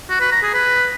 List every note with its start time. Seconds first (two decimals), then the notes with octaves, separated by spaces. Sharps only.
0.09 F#4
0.21 B4
0.32 A#5
0.43 G#4
0.54 B4